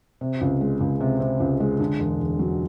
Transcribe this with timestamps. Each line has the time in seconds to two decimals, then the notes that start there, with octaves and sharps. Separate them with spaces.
0.21 C3
0.41 C#2
0.61 G#3
0.81 C#2
1.01 C3
1.20 C3
1.40 C#2
1.60 G#3
1.80 D3
1.99 E1
2.20 E1
2.39 F#3